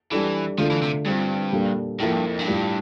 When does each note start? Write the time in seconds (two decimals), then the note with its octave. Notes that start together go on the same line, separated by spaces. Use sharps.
0.12 E3 G3 D4 A4
0.58 D3 F3 A3 D4 F4 A4
0.70 E3
0.82 C3
1.05 G2 G3 C4 F4
1.53 A#2 G3 A#3 D4 A4
2.00 A2 F3 A#3 E4 A4
2.13 G2
2.26 F2
2.39 G2
2.47 A2 G3 D4 F4